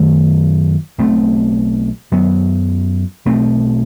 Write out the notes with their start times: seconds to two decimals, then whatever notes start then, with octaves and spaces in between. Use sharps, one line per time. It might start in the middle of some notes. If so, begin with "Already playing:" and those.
Already playing: F#2 D#3 F#3 A3
0.98 B1 B2 A3 C4
2.12 F#2 F#3 B3
3.25 B1 B2 A3 C4